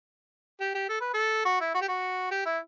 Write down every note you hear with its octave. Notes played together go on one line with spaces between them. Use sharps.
G4
G4
A4
B4
A4
F#4
E4
F#4
G4
F#4
G4
E4